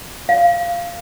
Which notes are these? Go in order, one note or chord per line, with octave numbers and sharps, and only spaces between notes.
F5